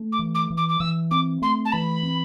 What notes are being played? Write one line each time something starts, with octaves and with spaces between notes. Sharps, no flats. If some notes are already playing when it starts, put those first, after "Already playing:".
Already playing: A3
D6
E3
D6
E3
D6
D6
E3 E6
C4 D6
A3 C6
A5
E3 B5
C4